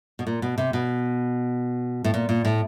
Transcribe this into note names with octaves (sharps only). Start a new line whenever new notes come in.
B2
A#2
B2
C3
B2
A2
A#2
A#2
A2